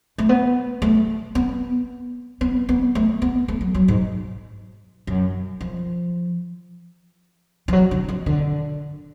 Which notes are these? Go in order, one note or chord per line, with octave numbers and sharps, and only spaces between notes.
A3
B3
A3
B3
B3
B3
A3
B3
A3
F#3
F#3
G#2
F#2
F3
F3
F#3
D3
F3
D3